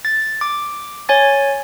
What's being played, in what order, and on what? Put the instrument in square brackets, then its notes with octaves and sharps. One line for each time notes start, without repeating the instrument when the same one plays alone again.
[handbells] A6
D6
C#5 G#5 A6